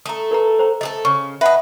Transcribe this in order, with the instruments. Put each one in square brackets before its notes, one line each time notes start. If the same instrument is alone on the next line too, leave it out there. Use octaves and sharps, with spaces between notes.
[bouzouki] A3 A4 [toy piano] A#5 D#6
[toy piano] A#4 B4 A#5
C5 A#5
[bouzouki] A3 G#4 A4 [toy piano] D#5
[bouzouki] C#3 [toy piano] C#6
[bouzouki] B4 D#5 [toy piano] E5 F#5 A5